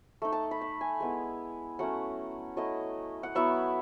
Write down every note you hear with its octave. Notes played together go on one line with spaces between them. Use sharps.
A3 D#4
A5
B5
B5
G#5
G#3 B3 E4
F#3 A3 C#4 F#5
F#3 A3 E4 D#5
F#5
F#3 B3 E4 E5